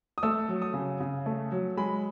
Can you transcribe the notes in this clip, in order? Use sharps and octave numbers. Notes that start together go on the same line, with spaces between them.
D#6
A3 E6
F#3
D#6
C#3
C#3
A3
F#3
G#3 B5